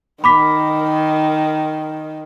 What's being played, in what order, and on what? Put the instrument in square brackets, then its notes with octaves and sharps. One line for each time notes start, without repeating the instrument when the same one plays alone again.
[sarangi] D#3 [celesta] B5 D6 B6